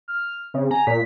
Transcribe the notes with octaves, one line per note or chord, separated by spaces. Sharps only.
F6
C#3 C4
G#5 A#5
A#2 B6